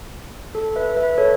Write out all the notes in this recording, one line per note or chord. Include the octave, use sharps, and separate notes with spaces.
A4
B4 E5
B4 E5
A4 C#5